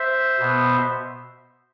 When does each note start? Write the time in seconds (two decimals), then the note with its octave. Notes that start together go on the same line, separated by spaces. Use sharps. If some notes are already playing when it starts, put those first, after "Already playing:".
Already playing: C5 E5
0.39 B2 B3